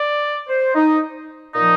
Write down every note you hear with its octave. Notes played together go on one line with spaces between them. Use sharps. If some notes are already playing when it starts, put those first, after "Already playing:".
Already playing: D5
C5
D#4
A#2 F3 D#4